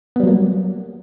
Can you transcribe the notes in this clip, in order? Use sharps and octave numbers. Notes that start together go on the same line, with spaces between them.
F#3 G3 A#3 B3